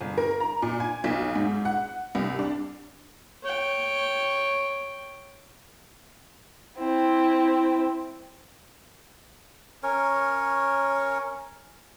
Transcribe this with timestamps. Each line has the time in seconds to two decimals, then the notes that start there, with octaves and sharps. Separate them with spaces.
0.01 G1
0.18 A#4
0.40 A#5
0.62 A#2
0.80 G#5
1.04 B1
1.35 G#2
1.65 F#5
2.15 C2
2.39 D4
3.43 C#5 G5
6.77 C4 E4
9.83 C#4 A#4 C#5